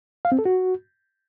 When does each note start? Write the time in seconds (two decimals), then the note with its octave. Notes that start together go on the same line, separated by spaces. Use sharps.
0.25 F5
0.32 C4
0.39 A4
0.45 F#4